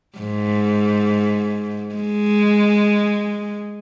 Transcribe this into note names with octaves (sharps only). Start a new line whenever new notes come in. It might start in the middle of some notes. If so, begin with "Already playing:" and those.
G#2
G#3